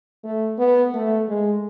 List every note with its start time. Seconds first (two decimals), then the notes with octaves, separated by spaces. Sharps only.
0.24 A3
0.58 B3
0.94 A3
1.28 G#3